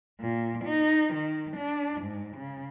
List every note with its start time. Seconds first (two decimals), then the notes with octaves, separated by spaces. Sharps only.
0.20 A#2
0.65 D#4
1.14 D#3
1.57 D4
2.01 G#2
2.37 C#3